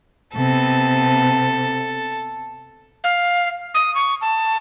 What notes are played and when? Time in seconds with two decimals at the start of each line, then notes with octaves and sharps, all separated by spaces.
0.36 C3 B3 A4
3.04 F5
3.74 D#6
3.95 C#6
4.21 A5